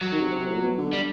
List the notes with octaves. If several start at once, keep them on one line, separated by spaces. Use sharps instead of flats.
F#3
D#3
C3
C3
A2
A#2
B2
D3
G3